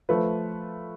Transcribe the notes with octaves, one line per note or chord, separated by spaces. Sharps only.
F3 A3 F4 B4